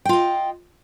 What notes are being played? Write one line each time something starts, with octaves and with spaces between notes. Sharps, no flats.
F4 D#5 G5